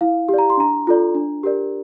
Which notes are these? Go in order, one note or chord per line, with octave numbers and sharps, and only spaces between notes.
E4 F5
G4
D5 A#5
C6
D4 A#5
F4 A4 D5
D4
G4 A#4 D5